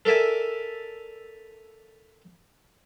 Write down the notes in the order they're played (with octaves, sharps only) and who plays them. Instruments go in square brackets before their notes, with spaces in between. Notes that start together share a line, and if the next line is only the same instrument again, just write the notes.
[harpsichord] A4 A#4 D5 E5 G#5